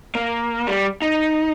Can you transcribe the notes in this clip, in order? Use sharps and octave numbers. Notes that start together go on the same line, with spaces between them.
A#3
G3
D#4